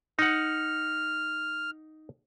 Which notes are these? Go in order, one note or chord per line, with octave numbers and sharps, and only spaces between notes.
D#4 F#5 F6